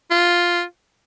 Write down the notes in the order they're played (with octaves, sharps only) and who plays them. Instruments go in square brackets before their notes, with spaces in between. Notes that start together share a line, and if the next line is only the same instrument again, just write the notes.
[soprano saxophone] F4